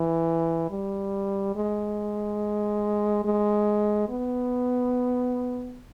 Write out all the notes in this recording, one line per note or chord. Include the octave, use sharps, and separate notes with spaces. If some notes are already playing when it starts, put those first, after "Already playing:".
Already playing: E3
G3
G#3
G#3
B3